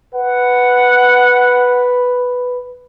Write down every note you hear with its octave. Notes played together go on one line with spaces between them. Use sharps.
B4 F#5